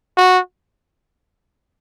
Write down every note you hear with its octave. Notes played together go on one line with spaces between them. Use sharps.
F#4